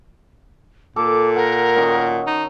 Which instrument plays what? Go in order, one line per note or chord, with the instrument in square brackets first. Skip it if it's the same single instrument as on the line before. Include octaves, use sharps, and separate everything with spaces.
[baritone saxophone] A#2 [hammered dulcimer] A4 [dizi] D6
[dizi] A#4 [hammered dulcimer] F#5
[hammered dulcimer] D#3 C#4 F#4
[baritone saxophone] D#4